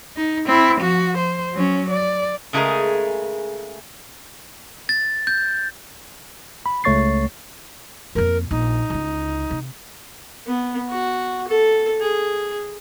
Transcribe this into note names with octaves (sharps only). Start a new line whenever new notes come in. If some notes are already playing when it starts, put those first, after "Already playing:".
D#4
C4 E4
F3 F#4
C5
F#3 C#4
D5
C#3 G#3 A3 E4 G#4 A#4
A6
G6
B5
C#2 A3 C#5 C#6 A6 C7
F2 A#3 A#4
A#1 D#4
C#2 D3
C3
B3
F#4
A4
G#4